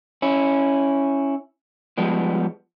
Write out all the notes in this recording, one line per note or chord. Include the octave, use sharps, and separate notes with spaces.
C#4 E4
F3 G3 G#3 B3